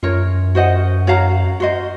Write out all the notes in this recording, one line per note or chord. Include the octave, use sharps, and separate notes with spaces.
F#2 F4 A#4 C#5
F#4 C5 D#5 F#5
F#4 C#5 F5 A#5
F#4 C5 D#5